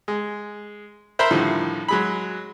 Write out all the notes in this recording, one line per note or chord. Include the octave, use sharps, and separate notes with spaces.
G#3
A#4 C5 E5 A#5 B5
A2 D3 D#3 F3 G3
F#3 G#3 B5